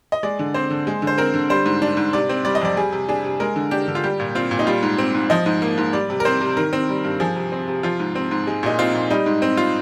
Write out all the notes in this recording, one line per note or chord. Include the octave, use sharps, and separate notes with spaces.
D#5
G#3 D5
D3
C4 C5
D3
G#3
D3
C5
C4 A#4
D3
G3 C5
G#2
D4
G#2
C3 D5
C4
G3 D5
D#5
F2 D5
G3 G#4
C3
D4 G#4
C3
G#3 A#4
D3
D4 G4
D3
F4
G3 G4
A#2
C4 F4
A#2
D#4
G3 F4
G#2
C4
G#2
F3 D#5
G#2
A#3
G#2
G3 D5
C3
A#4
C4 C5
C3
D#3 A#4
C4
G3
G2
F3 G#4
C3
C4
C3
F3 F4
G#2
C4
G#2
G#3
A#2 D#4
C4 F4
A#2
G3 D#4
G#2
C4
F4